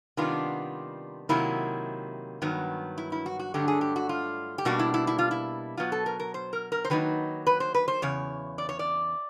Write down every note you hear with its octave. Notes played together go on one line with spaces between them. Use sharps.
C3 D#3 G3 B3 D4 F4
C3 D#3 F#3 A#3 E4
G2 D#3 F#3 B3
E4
E4
F#4
F#4
G2 D3 F#3 A3 G4
G#4
G4
F#4
F4
G4
B2 G3 A#3 D4 F#4
E4
E4
E4
F4
E4
B2 F#3 B3 F4
A4
A#4
A#4
C5
A#4
A#4
C5
D#3 F#3 A#3 D#4 B4
B4
C5
B4
C5
E2 C#3 C#5
D5
C#5
D5